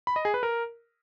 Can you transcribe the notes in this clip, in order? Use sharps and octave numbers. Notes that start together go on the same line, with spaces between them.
B5
D#5
G#4
B4
A#4